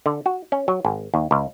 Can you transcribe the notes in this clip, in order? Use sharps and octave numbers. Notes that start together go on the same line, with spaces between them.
D3
F#4
C#4
F#3
G#1
D#2
C#2